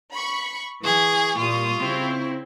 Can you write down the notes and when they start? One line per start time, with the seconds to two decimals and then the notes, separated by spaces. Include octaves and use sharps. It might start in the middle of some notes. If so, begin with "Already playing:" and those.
0.13 B5 C#6
0.84 E3 G#4 C#6
1.38 A#2 G3 F4 D#6
1.79 C#3 C4 E4